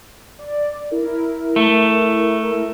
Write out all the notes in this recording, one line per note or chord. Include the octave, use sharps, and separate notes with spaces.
D5
E4 A#4
A3